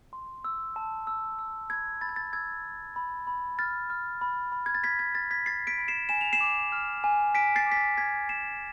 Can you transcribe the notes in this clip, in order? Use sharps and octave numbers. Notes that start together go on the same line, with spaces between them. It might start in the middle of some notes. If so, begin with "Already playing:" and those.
C6
E6
A5
E6
E6
B5 G#6
B5 A6
G#6
A6
E6 G#6
E6
B5
B5
F6 A6
F6
B5
B5
G#6
A6
F6 G#6 B6
G#6
F6 A6
G#6 B6
B5 A6 C7
B6 D7
B5
C7 E7
G#5 E7
F7
C7 E7
D6
F6
G#5
G#5 B6 D7
A6 C7
D6
B6
A6
F6 G#6 B6
G#5 C7 E7